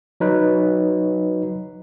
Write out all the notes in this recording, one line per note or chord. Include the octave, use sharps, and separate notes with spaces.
F#3 D#4 B4